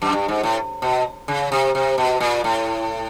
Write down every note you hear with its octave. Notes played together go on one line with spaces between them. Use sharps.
F#2
G2
G#2
A2
B2
C#3
C3
C3
B2
A#2
A2